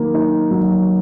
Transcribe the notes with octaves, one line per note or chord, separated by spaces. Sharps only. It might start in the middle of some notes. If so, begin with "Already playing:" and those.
Already playing: D#3 F#3 A#3
D#4
F#3